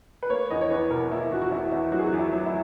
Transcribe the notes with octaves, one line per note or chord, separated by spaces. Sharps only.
B4
A#3 C#5
E2 D#5
C#5
E2 B4
B2 A#4
A#3 E4
E2 F#4
F#4
E2 E4
E2 E4
F#3 F#4
G#4
F#4
E2
E4
F#3
E4